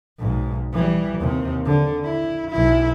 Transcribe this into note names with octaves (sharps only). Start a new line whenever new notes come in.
B1 G#2
E3 G3
D#2 C3
D3
E4
B1 E4